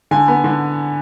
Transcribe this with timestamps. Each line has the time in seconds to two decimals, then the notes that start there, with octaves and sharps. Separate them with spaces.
0.11 D3 G#5
0.28 B3
0.44 D3